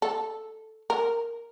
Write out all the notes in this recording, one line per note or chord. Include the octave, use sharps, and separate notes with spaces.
A4
A#4